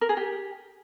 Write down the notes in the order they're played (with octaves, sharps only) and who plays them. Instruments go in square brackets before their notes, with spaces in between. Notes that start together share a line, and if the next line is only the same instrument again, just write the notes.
[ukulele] A#4
G#4
G4